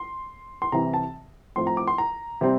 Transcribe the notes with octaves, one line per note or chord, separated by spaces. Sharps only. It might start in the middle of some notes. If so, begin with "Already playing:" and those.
Already playing: C6
C6
C2 C3 E3 A#5
A5
A2 F3 C4 C6
A#5
D6
C6
A#5
C3 G3 C4